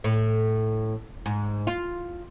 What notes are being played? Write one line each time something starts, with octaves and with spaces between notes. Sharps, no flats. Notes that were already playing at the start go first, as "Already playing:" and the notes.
A2
G#2
F4